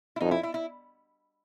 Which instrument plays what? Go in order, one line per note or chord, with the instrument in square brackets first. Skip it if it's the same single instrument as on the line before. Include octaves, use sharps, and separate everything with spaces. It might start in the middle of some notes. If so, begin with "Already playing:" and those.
[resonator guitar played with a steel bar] E4
[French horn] F2 [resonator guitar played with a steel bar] D#4
[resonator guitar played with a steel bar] E4
E4
E4